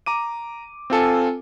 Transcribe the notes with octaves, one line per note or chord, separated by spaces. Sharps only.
A#5 D6 D#7
C4 F4 A4 G#5